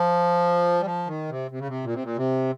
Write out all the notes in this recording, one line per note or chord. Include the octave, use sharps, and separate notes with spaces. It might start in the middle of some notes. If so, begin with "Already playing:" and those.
Already playing: F3
G3
F3
D#3
C3
C3
C#3
C3
A#2
C3
A#2
C3